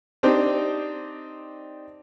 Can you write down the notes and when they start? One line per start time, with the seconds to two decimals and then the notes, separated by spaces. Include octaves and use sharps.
0.23 C4 D4 D#4 G4 C5